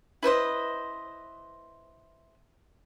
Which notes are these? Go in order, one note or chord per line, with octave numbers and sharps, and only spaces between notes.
E4 B4 C5 D#5